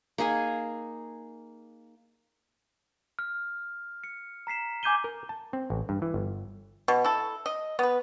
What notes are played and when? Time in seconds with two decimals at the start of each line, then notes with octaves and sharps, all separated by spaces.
0.18 A#3 D#4 G#4 G#5
3.19 F6
4.04 C#7
4.47 A#5 B6 C7 E7
4.83 G#5 D6 G6 G#6 D#7 G7
5.04 A#4
5.29 A5
5.53 C4
5.70 A1
5.89 G2
6.02 E3
6.14 G1
6.88 B2
7.04 E4 A4
7.46 D#5
7.79 B3 B4